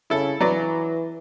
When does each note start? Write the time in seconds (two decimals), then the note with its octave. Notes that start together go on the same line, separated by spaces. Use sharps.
0.10 C#3 E4 A4
0.41 E3 F#3 B4 D5